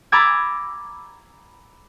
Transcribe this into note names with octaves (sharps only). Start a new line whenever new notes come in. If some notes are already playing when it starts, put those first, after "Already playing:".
A#5 B5 D6 E6 G#6 A6